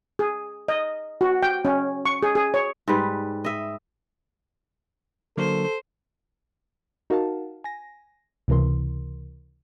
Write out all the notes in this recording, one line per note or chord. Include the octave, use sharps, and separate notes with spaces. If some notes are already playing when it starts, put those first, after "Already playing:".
G#4
D#5
F#4
G5
C#4
C#6
G#4
G#4
C#5
G#2 G3 B4
D#5 E5
D3 F#3 A#3 A4 C5
D#4 F#4 A#4 F5 F#5 A5
G#5 A#6
C#2 C3 E3 A#4 C6